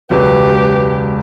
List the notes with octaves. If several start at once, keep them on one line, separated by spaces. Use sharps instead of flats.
E1 C#2 F#3 G4 B4